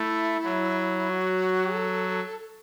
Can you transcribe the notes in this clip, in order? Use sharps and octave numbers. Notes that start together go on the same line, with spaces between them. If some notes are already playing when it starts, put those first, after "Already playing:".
Already playing: A3 E4
F#3
F#4
A4